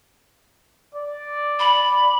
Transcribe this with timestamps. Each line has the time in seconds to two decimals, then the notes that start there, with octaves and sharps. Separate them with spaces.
0.95 D5
1.59 B5